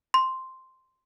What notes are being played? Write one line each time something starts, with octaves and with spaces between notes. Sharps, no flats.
C6